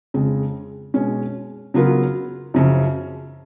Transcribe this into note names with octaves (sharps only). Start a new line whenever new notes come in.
F2 C#3 G#3
B2 G#3 C#4
C#3 F#3 B3 F4 A#4
F#2 C#3 F3